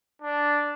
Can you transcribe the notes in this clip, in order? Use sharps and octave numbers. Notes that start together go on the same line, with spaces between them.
D4